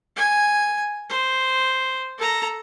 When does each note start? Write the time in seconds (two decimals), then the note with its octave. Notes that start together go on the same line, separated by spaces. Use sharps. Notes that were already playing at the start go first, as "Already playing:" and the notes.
0.16 G#5
1.09 C5
2.18 A4 A#5